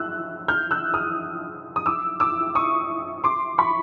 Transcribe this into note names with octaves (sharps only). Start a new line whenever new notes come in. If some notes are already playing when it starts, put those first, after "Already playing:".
Already playing: E6 F#6
F6 G6
E6 F#6
D#6 F6
D#6
D6 E6
D6 E6
C#6 D#6
C6 D6
B5 C#6